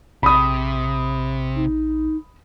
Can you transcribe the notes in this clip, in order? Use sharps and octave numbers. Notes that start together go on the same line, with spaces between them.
A#1 C3 B5 D#6
D#4